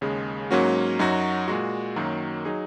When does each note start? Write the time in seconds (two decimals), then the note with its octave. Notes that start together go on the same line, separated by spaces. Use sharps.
0.01 D#2 C#3 G#3
0.51 G#2 F#3 A#3 C#4 F#4
0.99 F#2 F#3 D#4 F#4
1.48 A#2 G#3 F#4
1.96 F#2 D#3 F#3 A#3
2.45 F#3 D#4 G#4